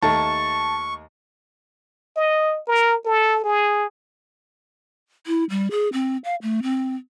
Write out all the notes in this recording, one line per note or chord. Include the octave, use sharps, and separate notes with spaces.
D#2 A3 A5 C#6
D#5
A#4
A4
G#4
E4
G3
G#4
C4
F5
A3
C4